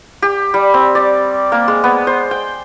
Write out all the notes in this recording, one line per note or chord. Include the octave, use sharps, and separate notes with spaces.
G4
G3
C4
D5
A#3
G#3
B3
C5
G5